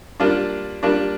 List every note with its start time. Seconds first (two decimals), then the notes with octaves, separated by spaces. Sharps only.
0.20 G3 A#3 D4 F4
0.83 G3 A#3 D4 F4